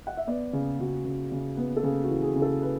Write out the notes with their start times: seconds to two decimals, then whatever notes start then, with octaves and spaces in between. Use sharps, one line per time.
0.07 F#5
0.17 E5
0.27 B3 D5
0.53 C#3 G#4
0.79 C#3 F#4
1.06 C#3
1.32 C#3
1.57 B3
1.76 A4
1.83 C#3 G#4
2.04 F#4
2.10 E3
2.22 G#4
2.36 C#3
2.42 A4
2.62 B4